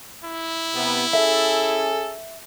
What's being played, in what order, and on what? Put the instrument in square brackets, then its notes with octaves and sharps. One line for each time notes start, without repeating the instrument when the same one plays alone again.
[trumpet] E4
[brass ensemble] C3 B3
[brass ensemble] C#4 G#4 A4 [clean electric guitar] E5